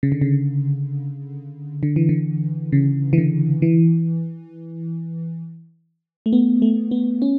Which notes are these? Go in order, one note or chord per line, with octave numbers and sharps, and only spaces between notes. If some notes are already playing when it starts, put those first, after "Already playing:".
C#3
D3
C#3
D3
E3
D3
C#3
E3
D3
E3
A3
B3
A3
B3
C#4